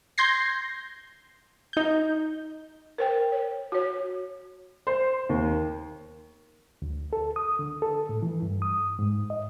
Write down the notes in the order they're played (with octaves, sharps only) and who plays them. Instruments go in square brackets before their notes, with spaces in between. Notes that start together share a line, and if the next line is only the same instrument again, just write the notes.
[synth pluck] C6 G6 G#6 A#6 C7
D#4 G6
[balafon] A#4 C5 G5
C#5
F#4 C#5
[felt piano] C5
D#2
[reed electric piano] D2
A4
D#6
D3
A4
A2
E3
G2
D#6
G#2
D#5